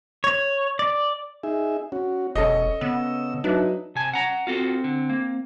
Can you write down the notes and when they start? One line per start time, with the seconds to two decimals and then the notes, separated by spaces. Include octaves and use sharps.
0.24 C#5
0.79 D5
1.43 D#4 G#4 E5
1.92 C#4 F#4
2.35 E1 C#4 A4 C#5 D#5
2.81 C#3 B3 E6
3.44 F#3 D4 D#4 B4 E5
3.95 C3 G#5 A5
4.13 C#4 F#5 A#5
4.47 C4 F4 F#4 A4
4.84 D3
5.09 A#3